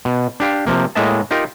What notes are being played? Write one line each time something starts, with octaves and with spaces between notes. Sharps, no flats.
B2
D4 G4 F5 G5
C3 F3 A#3
A2 G#3 A#3 D#5 E5 A5
D#4 F4 G4 A#4